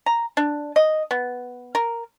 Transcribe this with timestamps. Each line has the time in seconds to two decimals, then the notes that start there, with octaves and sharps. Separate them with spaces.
0.06 A#5
0.37 D4
0.76 D#5
1.11 B3
1.75 A#4